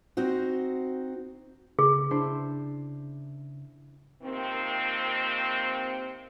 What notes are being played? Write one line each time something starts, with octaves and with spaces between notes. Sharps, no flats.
C4 D#4 F#4 C5
C#3 G#4
D4 E4 C5
C3 D#3 F3 A#3 C4